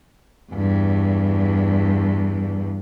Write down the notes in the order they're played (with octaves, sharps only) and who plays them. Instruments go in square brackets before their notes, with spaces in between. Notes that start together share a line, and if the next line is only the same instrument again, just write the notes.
[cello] E2 G2